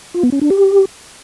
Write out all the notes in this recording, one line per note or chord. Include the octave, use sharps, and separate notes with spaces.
F4
B3
C#4
D4
G4